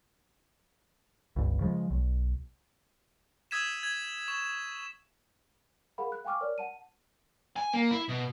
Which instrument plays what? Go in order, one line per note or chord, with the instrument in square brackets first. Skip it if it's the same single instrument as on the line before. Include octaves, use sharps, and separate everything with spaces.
[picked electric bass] G1 C#2
C#3 F3 G#3
B1
[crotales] D#6 E6 G#6 B6 D#7 E7
G#6
C#6 E7
[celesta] G#4 A#4 F5 F#5 B5
F#6
F5 G5 G#5 C#6 D6 F6
A#4 C#5 D5 F6
F#5 A5 D#7
[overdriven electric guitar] G#5
A#3
E4
B2